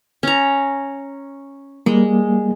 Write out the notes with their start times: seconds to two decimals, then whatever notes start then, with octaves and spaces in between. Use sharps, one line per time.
0.23 C#4 A#5
1.86 G3 G#3 A#3